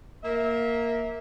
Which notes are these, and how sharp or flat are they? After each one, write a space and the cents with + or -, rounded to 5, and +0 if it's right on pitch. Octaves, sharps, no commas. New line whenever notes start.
A#3 +0 E5 -25